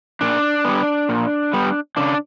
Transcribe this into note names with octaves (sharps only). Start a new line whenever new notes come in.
A#2 D4
G3 B3
A#2
G3 B3
C#3 D4